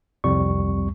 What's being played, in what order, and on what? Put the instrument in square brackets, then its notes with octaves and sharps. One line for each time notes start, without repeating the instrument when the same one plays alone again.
[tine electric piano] C2 F2 G3 C#6